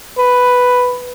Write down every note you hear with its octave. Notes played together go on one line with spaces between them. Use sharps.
B4